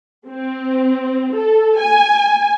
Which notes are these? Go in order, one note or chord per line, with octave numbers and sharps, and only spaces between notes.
C4
A4
G#5